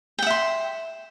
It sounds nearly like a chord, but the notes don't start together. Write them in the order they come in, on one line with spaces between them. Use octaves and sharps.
G5 F#5 E5 C6